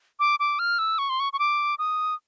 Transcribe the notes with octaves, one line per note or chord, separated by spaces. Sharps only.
D6
D6
F6
E6
C#6
C6
C#6
C#6
D6
D#6